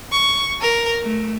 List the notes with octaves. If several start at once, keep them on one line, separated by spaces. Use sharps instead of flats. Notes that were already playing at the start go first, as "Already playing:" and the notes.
C#6
A#4
A3